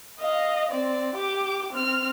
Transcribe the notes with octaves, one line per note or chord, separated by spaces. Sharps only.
D#5 F5
C4 D5
G4 D6
C4 F6